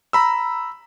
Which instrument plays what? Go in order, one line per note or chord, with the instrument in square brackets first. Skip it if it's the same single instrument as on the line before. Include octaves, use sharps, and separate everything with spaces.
[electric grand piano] A#5 B5 E6